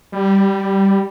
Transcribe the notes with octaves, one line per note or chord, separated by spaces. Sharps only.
G3